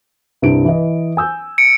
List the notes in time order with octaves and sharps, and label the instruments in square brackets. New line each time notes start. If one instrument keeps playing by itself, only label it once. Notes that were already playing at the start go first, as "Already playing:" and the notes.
[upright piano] C2 G2 D7
E3 D#5
G#5 E6 G6
[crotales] C#7 D7